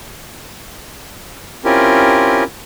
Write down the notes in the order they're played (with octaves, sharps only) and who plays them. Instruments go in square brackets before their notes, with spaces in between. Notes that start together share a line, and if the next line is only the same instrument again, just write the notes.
[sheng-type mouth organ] C4 C#4 E4 F4 G4 A#4